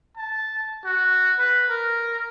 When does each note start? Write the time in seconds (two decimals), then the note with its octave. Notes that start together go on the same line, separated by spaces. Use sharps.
0.17 A5
0.85 F#4
1.39 B4
1.70 A#4